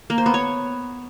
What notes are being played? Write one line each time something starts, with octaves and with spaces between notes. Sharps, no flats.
A#3
C5
B3
C#5